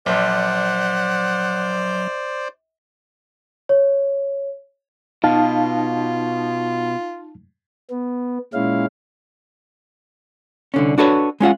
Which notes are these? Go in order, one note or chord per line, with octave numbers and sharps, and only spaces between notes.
A#1 F#3 C5 D5 F#5
C#5
B2 D#4 F4 F5 A5
B3
A#2 G#3 C#4 E4 F5
C2 D3 C#4
D4 F#4 A4 B4 C#5
G#3 C#4 F4 F#5